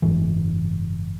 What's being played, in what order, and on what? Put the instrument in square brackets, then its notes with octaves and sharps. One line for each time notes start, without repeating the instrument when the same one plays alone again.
[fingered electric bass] F#1 G#2 E3